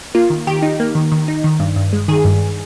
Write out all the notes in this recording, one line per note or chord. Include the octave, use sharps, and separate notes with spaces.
A#3 F4
D#3
D#3 G4
D#4
A#3
D#3
D#3
D#4
D#3
G2
G2
G#3
D#3 G#4
G2